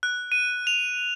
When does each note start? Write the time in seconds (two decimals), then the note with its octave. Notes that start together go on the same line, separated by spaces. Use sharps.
0.03 F#6
0.32 D#7
0.67 F7